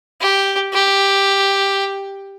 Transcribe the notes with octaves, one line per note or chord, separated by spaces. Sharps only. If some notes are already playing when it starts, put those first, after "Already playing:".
G4
G4